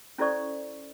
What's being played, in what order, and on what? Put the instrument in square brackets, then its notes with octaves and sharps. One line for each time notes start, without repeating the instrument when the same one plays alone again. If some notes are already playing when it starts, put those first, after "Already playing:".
[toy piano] C#4 E4 A4 C5 D5 C#6